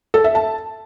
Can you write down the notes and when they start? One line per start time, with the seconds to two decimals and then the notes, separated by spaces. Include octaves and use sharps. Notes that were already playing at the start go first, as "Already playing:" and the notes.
0.14 A4
0.24 E5
0.35 A5